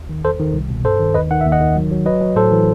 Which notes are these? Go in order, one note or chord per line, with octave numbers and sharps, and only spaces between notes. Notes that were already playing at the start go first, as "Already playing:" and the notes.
Already playing: D#2
D#3
E2 A4 C5
D#3
C2
B2
G2 A4 C5
D#3
D#2 B4 D#5
D#3 F#5
D#2 E5
D#5 F#5
D#3
F#3
F#3
F#3 B4 D#5
F#3
A2 A4 C5
E3